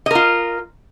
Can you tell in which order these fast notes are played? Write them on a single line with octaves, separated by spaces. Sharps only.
D#5 A#4 F4